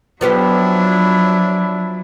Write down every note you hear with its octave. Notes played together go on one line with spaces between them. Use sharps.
F3 F#3 B3 D4 E4 G4